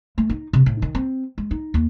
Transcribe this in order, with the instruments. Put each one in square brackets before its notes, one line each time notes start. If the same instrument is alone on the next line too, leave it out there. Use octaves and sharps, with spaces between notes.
[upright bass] A3
D#4
C3
A2
D#3
C4
G#3
D#4
D#2